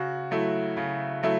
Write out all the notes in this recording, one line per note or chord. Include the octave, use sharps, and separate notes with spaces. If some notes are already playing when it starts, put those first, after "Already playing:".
Already playing: C#3 F#4
F#3 A3 E4
C#3
F#3 A3 E4